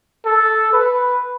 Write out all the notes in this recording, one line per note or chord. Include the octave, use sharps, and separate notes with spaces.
A4
B4